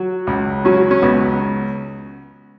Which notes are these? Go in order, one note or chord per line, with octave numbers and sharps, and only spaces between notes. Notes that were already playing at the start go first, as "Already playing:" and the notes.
Already playing: F#3
C#2
F#3 C#4
C#4
C#2 B3